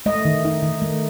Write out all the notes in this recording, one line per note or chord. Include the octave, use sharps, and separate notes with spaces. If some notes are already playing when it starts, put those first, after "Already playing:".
A3 D#5
D#3
D#4
D#3
A3